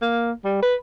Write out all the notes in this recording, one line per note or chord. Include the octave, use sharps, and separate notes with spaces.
A#3
G3
B4